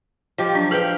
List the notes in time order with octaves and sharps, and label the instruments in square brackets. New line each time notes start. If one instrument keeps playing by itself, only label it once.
[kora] F3 G4 [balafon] D#5 G5
[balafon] F#3 D4
[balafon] G#4 B4 [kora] F5 G5